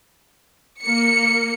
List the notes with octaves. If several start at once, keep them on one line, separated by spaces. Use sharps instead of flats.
A#3 C#7